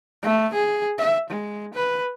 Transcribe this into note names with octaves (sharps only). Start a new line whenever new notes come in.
A3
G#4
E5
G#3
B4